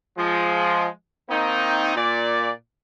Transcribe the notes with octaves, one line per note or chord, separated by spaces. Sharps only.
F3 G#3
D#3 A#3 C4 D#4
A#2 D5